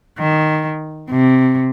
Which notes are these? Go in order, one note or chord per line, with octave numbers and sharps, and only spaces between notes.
D#3
C3